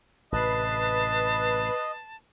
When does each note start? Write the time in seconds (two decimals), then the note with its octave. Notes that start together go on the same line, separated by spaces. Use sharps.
0.32 A1 A2 C3 B4 D#5 A5 C7